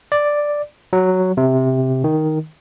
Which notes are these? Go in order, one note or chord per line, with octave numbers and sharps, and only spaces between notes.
D5
F#3
C3
D#3